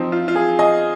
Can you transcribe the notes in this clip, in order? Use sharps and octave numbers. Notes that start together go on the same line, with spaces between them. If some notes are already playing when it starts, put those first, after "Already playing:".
Already playing: F3 C4 D#4
F4
F4
G#4
D#5 G#5